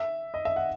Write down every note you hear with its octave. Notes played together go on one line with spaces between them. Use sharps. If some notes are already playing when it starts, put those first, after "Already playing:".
Already playing: E5
D#5
E5
F#5